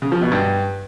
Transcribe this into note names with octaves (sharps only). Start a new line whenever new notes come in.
C#3
F3
B2
G2